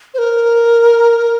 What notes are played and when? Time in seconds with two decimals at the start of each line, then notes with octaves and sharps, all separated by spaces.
0.14 C5
0.18 A#4